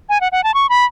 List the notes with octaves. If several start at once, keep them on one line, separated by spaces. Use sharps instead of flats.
G#5
F#5
F#5
A5
C#6
B5